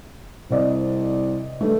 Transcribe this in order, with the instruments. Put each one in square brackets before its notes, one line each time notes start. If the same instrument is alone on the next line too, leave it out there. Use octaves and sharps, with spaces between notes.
[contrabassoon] C2 [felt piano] C3 D5 D#5
[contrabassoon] G2 [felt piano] D#3 A3